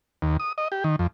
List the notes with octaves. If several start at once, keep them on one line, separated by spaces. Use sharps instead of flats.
D#2
D#6
D#5
G4
D#3
F2